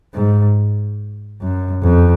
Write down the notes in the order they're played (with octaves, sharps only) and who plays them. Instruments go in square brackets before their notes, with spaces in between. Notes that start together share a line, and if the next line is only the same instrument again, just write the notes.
[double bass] G#2
F#2
F2